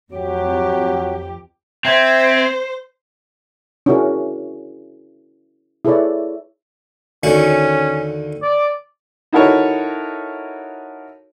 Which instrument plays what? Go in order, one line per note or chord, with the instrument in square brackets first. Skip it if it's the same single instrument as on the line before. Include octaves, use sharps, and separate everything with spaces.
[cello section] F2 G4 [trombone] F#3
[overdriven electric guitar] C4 [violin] C5 [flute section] E5 G#6
[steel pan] C#4 D4 E4 F#4 G#4 A#4
E4 G#4 A4 B4 C#5 D5
[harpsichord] D#2 D3 F#4 [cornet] C#4
[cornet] D5
[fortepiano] D#4 E4 F#4 A4 A#4 C#5